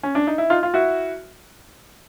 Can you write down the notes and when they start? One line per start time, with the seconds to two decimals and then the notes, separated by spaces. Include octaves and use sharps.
0.03 C#4
0.15 D4
0.27 D#4
0.38 E4
0.50 D#4 F4
0.63 F4
0.74 E4 F#4